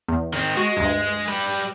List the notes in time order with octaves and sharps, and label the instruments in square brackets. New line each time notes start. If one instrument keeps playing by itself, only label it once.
[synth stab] E2
[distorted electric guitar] D#3 C4
[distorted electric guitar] G#3 [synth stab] F#4
[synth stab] D2 G2
[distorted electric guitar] G3 B4